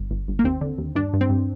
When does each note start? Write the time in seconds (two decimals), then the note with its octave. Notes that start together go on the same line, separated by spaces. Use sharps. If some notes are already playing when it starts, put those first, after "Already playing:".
Already playing: G1
0.11 G1
0.28 G1
0.39 A#3
0.44 D#2 C4
0.61 D3
0.78 D#2
0.95 G2 D4
1.13 G2
1.21 C4
1.29 G2